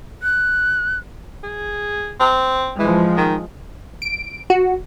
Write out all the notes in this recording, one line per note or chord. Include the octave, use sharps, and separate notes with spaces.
F#6
G#4
C4
E3 F3 G#3
D#3
D7
F#4